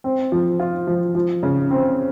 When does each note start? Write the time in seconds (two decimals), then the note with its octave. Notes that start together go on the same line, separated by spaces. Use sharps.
0.04 C4
0.32 F3
0.60 F4
0.87 F3
1.15 F3
1.43 C#3
1.71 C4